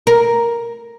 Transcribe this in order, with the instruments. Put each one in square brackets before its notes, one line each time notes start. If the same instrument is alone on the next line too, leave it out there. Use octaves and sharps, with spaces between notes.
[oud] A#4